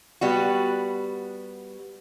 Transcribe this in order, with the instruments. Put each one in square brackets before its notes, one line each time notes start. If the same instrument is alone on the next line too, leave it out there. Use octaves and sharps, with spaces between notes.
[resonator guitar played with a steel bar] G3 B3 F#4